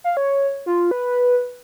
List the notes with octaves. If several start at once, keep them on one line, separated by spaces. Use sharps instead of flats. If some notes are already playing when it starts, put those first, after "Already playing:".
F5
C#5
F4
B4